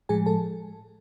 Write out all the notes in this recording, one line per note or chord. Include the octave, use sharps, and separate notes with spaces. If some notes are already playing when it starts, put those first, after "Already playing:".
A2 F3 G#3 G#4 G#5
A4 A5